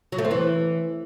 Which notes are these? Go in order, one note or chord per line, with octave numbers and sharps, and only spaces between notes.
F#3
A3
C4
E3